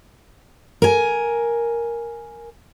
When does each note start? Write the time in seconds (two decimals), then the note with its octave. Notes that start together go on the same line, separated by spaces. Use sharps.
0.82 A#4 G#5